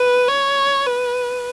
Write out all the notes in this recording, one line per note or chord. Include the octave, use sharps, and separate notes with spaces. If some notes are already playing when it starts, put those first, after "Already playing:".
Already playing: B4
C#5
B4